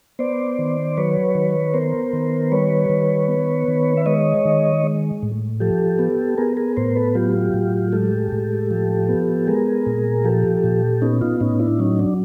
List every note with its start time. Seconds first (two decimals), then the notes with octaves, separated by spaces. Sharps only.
0.19 B3 C5 D5
0.59 D#3
0.97 F#3 B4 C#5
1.35 D#3
1.74 B3 A#4 C5
2.13 D#3
2.52 G3 B4 C#5
2.90 D#3
3.28 B3
3.68 D#3
3.97 E5
4.06 G#3 C#5 D#5
4.45 D#3
4.84 G#3
5.23 A2
5.60 F3 G4 A4
5.99 B3
6.38 B3 G#4 A#4
6.57 G#4 A#4
6.76 A2 A#4 C5
6.96 A4 B4
7.15 F#3 F4 G4
7.54 A2
7.92 G#3 G4 A4
8.32 A2
8.71 F3
9.09 B3
9.47 G#3 G#4 A#4
9.86 A#2
10.24 F3 G4 A4
10.64 A#2
11.02 B3 C#4 D#4
11.21 D#4 F4
11.41 A2 C#4 D#4
11.60 D4 E4
11.79 F#3 C#4 D#4
11.99 D4